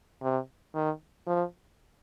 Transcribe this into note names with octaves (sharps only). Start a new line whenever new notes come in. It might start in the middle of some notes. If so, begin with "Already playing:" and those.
C3
D#3
F3